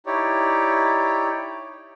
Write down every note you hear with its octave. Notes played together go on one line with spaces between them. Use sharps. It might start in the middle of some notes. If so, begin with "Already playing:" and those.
D#4 E4 G4 C#5 D5